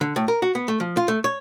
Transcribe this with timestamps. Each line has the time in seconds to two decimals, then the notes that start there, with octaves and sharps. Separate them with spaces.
0.01 D3
0.16 A2
0.28 A#4
0.42 F#4
0.55 B3
0.68 A3
0.80 F3
0.97 F4
1.08 A3
1.24 C#5